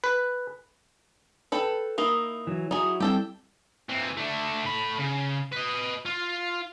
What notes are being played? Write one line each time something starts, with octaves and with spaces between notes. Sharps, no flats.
B4
A4 B4 G5
A#3 D#4 E4
E3 F#3
F#3 D#4 E4 F#4 G#4
G3 C4 E4 G4 A4 G5
E3 C4
A3 D4
A2 B5
C#3
B4 D#5
F4